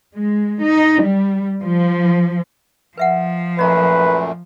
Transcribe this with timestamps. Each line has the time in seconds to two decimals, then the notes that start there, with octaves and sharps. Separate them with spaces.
0.15 G#3
0.62 D#4
1.01 G3
1.62 F3
2.98 F3 B4 E5 F#5
3.59 F#2 A#2 A3 B4 D#5 A#5